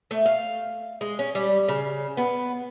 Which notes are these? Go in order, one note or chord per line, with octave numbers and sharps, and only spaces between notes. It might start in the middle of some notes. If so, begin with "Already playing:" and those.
A3
F5
G#3
C#4
G3
C#3
B3